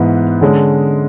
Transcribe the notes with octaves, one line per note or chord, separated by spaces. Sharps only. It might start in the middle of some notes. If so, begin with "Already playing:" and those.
Already playing: G#2 E3 B3
D3 G#3 C#4